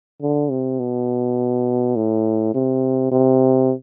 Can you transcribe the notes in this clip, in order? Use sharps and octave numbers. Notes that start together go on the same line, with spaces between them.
D3
C3
B2
A2
C3
C3